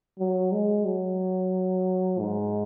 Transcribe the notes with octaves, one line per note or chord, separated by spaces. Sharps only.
F#3
G#3
F#3
G#2